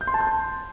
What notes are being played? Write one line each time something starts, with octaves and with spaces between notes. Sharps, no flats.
G6
C6
A5
G6
C6